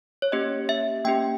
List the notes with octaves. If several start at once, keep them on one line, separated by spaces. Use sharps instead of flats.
C#5
A#3 C#4 G4 D#5
E5
A#3 C#4 G4 G5